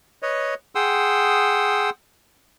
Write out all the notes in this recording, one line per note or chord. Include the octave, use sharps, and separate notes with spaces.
B4 C#5 D#5
G#4 F#5 G5 C6 D#6 E6